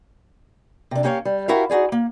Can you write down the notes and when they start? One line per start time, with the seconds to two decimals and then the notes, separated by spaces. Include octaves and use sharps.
0.91 C3 D4
1.03 A#3 C#4 G4 C5 C#5 F5
1.25 G3
1.48 E4 F#4 G4 A#4 E5 F5
1.70 D#4 F#4 G#4 D5
1.92 A#3